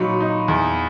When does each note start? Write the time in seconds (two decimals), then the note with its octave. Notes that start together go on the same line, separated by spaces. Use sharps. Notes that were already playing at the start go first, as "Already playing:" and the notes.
Already playing: A#2 F#3 D#4 B5 C#6
0.21 D#4
0.48 E2